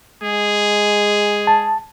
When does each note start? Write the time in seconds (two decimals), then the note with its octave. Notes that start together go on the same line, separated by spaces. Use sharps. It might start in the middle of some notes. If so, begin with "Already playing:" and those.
0.23 G#3 G#4
1.47 A5